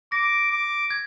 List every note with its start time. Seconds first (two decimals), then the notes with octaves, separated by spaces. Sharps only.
0.12 D6 A#6
0.51 D6
0.91 G#6